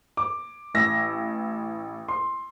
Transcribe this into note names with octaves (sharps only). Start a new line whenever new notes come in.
D6
A1 E6 A#6
C6